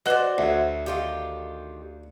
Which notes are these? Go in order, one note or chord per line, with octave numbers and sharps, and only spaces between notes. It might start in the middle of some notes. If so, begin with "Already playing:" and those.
F#4 B4 C5 D5 D#5
D2 C#5 E5
D#3 F4 G4